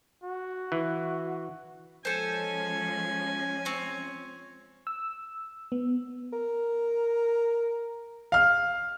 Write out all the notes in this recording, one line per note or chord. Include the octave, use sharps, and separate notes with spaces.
F#4
E3
F3 G#3 C#4 A4 C5 G#5
C4 C#5
E6
B3
A#4
F5 F6